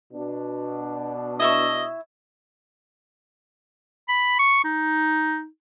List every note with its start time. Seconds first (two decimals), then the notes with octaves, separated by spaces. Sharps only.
0.12 B2 D4
1.40 E4 D#5 E5 C#6
4.08 B5
4.39 C#6
4.64 D#4